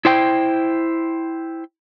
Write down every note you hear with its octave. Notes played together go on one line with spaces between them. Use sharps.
E4 C5 G5